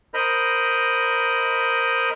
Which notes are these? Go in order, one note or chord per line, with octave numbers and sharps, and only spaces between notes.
A#4 C5 D#5 B5